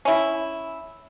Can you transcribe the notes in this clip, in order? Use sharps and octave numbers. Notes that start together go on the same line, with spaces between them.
C#4 E4